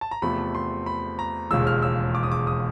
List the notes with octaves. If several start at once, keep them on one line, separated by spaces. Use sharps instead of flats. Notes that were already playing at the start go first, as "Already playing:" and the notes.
A5
A#5
E2 C3 F3 A3 B5
C6
B5
A#5
E1 D#2 C#3 F3 G#3 E6
F6
E6
D6
D#6
D6
D#6